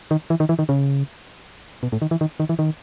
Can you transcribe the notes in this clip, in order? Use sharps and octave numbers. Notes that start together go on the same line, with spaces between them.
D#3
E3
D#3
E3
D#3
C#3
B2
A2
D#3
E3
D#3
D#3
E3
D#3